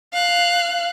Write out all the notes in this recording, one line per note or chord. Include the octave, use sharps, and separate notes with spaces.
F5 F#6